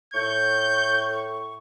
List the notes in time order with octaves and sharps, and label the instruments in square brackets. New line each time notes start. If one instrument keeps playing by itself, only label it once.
[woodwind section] A2 C#6 [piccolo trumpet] G6